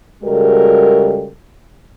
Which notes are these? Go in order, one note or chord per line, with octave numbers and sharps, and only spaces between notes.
C#3 G3 G#3 F#4 A4 A#4